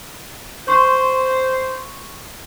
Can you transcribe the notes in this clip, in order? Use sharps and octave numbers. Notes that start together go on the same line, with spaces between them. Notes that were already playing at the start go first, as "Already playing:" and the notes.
C5 C6 C#6